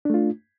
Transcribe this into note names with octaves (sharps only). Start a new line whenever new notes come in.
A3 D4 F4